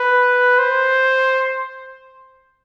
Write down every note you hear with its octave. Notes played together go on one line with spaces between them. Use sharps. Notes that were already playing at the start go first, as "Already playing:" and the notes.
Already playing: B4
C5